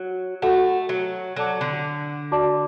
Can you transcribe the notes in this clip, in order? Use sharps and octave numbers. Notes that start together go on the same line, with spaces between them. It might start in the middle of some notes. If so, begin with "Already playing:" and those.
Already playing: F#3
A3 F#4 A4 F#5
F#3
F#3 A4 D5 A5 D6
D3
F#4 D5 A5 D6